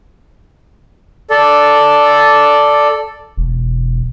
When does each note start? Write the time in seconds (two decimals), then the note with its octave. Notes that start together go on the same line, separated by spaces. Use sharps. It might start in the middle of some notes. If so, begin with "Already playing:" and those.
1.30 A4 D5
3.37 E1